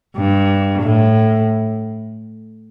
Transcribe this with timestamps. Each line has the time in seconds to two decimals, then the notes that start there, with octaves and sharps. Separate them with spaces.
0.17 G2
0.82 A2